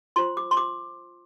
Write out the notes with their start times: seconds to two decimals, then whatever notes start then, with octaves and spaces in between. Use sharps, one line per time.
0.16 F4 C5 C6
0.37 D6
0.51 C6
0.57 D6